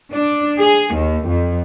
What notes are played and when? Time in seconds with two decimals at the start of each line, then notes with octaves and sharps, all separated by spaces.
0.12 D4
0.60 G#4
0.95 D#2
1.29 F2